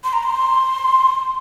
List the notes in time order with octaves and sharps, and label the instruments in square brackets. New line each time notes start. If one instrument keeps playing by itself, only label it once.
[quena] C6
A#5
C6